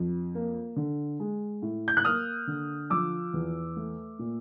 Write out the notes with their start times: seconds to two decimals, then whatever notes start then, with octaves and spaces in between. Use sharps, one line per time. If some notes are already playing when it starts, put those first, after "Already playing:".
Already playing: F2
0.35 A#3
0.76 D3
1.20 G#3
1.62 A2
1.88 G6
1.97 F#6
2.05 A#3 D#6 F6
2.47 D3
2.90 F3 D6 E6
3.34 E2
3.76 A3
4.19 A#2